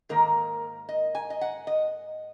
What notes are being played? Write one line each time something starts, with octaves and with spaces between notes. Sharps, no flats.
G#2 D#3 A#3 A#4
D#5
G#5
D#5
F#5
D#5